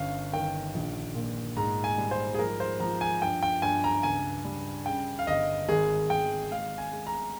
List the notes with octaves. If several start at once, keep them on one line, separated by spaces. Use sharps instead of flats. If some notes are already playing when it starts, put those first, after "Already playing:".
Already playing: G1 C#4 F5
D#3 G5
A#1
A#2
G#2 A#5
G#5
G3
C5
G#4
F3 A#4
C5
F3 A#5
G#5
G2 G5
G5
G2 G#5
A#5
C#2 G#5
G3
C#3 G5
F5
G1 D#5
G#1 G#4
G#1 G5
G#3 F5
G#5
G#3
A#5